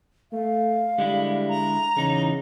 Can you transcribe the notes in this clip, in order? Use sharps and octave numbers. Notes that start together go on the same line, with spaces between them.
A3 F5
D3 G3 G#3 E4
A#5
E2 C#3 E3 D#4